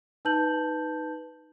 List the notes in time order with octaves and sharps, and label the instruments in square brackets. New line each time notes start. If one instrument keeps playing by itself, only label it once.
[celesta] D#4 B4 A5 G6 F#7